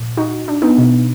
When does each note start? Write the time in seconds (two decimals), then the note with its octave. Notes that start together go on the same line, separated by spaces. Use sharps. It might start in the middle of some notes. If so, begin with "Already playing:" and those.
Already playing: A#2 F3
0.17 D#4 F#4
0.48 D4
0.62 B3 D#4
0.78 B2